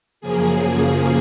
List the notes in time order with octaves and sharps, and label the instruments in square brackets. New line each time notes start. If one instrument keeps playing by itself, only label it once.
[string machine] F#2 C#3 F3 A#3 G#4